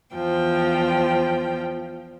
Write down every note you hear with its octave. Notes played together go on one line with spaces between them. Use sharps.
E2 F3 G5